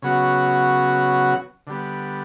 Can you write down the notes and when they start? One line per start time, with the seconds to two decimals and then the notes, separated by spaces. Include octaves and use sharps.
0.02 C#3 F#3 B3 F#4
1.67 D3 G3 B3